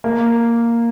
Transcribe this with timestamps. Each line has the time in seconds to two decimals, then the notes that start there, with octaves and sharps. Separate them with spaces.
0.04 A#3